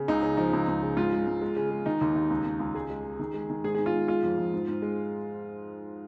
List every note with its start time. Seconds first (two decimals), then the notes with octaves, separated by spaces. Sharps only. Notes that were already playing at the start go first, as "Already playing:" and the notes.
Already playing: C#3
0.08 C#2 D#4
0.22 C#3
0.37 F3 D#4
0.53 C#2
0.68 C#2
0.82 C#3
0.97 G#2 F4
1.13 G#3
1.27 G#2
1.42 G#3
1.56 C#3
1.71 G#3
1.86 D#3 D#4
2.01 D#2
2.15 D#2
2.30 C#2
2.45 C#2
2.60 C#2
2.74 G#3 G#4
2.90 G#3
3.05 G#3
3.19 D#3
3.34 G#3
3.50 D#3
3.64 G#2 G#4
3.75 G#2 G#4
3.86 F4
3.94 G#2
4.08 G#3 F4
4.23 F2
4.38 F2
4.53 G#2
4.68 G#2
4.82 G#3